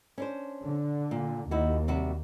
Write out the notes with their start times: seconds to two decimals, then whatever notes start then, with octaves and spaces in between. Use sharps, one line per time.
0.18 C#4 D4 C5
0.64 D3
1.11 A#2
1.51 D#2 D#4 E4 F#4
1.88 C3 G3 F#4